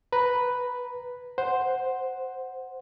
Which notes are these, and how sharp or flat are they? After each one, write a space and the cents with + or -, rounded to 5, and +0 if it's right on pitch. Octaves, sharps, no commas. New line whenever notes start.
B4 +0 A#5 +0
C5 +0 F#5 +0